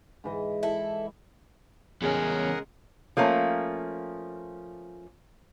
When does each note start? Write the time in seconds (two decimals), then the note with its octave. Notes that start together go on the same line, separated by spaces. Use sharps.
0.24 G#2 E3 D#5
0.63 E4 A4
2.02 E2 C#3 G#3 C#4 G#4 A#4 F#5
3.17 F3 A3 A#3 C#4